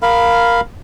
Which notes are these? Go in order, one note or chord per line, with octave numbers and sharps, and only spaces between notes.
A#4 F5 B5